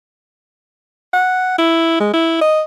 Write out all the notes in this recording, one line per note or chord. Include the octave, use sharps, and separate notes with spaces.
F#5
E4
G#3
E4
D#5